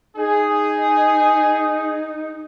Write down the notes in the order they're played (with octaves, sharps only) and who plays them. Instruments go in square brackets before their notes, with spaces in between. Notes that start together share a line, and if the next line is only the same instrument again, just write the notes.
[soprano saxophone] D#4 [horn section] G#4